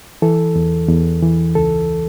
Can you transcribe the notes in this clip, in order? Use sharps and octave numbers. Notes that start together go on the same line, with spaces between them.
E3 A4
E2
E2
E3
C#2 A4